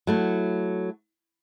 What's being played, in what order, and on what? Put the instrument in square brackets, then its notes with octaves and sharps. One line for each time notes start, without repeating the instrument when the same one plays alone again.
[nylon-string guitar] F#3 A3 E4